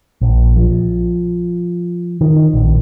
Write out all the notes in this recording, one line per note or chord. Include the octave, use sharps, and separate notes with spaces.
A#1
F3
D#3
A#1